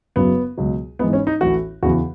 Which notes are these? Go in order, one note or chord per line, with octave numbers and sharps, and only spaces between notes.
F#1 F#2 C#3 F#3 B3
C#2 B2 F#3
G#1 G#2 E3 B3
C#4
D#4
A1 A2 E3 F#4
E2 C#3 E3 F#4